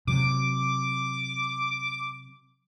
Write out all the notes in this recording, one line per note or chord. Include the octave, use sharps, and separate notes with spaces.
C3 F#3 D6